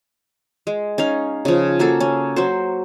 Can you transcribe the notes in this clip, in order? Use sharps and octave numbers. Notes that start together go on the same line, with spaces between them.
G#3
C#4 D#4 F5
C#3 F3
A#3 F#4 G#4 A4
C#4
F#3 F#4 C5